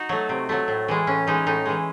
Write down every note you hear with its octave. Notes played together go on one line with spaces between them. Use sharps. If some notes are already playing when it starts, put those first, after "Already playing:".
Already playing: D#4 F#4
F#3 A3
C3
F#3 A3
A2
E3 G#3
A2 C#4
E3 G#3 D#4
A2 D#4
E3 G#3